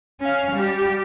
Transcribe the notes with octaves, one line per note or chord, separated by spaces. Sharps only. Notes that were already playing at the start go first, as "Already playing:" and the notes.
C#4 F5
G3 G4